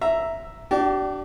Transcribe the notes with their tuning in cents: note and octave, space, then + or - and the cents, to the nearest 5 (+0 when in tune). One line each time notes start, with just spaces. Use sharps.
E5 +0 A#5 +0
D4 +0 G4 -45